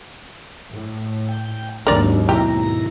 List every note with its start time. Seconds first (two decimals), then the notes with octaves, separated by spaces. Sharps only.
0.71 A2
1.29 G5
1.87 G#1 D#2 F#3 D4 A#4 D5
2.29 B2 E4 G4 A#5